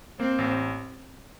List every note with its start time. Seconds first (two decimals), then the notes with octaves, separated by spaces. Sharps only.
0.20 A#3 C4
0.38 A1